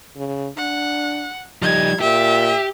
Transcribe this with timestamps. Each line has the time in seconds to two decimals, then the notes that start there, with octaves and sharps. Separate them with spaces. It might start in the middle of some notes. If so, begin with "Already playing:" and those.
0.16 C#3
0.57 D4 F#5
1.62 F3 G3 D#4 G#6
2.01 A#2 G4 E5